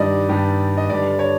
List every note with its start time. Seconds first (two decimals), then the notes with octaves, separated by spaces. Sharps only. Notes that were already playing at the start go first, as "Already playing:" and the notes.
Already playing: G2 D#3 G3 D5 D#5
0.29 G2 D#3 G3
0.77 D#5
0.90 G2 D3 G3 D5
1.19 C#5